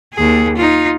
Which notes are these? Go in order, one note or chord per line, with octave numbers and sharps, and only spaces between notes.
D#2 G#4
D#4 F4